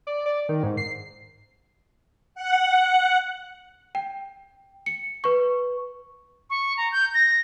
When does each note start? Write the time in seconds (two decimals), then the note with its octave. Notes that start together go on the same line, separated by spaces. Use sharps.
0.07 D5
0.26 D5
0.49 D#3
0.63 G#2
0.77 C7
2.35 F#5
3.95 G5
4.86 C#7
5.24 B4 C#6
6.50 C#6
6.77 A#5
6.92 G6
7.14 A#6